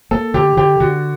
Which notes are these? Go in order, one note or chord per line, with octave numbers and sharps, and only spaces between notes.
A#3 A4
D3 G4
D3 G4
D3 F#4